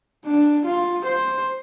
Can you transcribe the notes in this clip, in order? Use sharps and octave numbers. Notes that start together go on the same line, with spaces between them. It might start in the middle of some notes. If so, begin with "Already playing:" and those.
D4
F4
C5